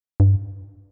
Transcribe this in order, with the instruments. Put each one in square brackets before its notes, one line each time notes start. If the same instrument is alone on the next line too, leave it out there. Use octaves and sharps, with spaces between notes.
[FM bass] G2